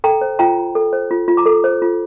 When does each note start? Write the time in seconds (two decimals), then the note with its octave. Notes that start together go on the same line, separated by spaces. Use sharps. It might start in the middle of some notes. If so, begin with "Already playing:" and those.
0.04 A4 G5 A#5
0.21 C5
0.39 F4 G5 A#5
0.58 F4
0.75 A4
0.93 C5
1.11 F4
1.28 F4
1.37 A#5 D6
1.46 A4
1.64 C5
1.82 F4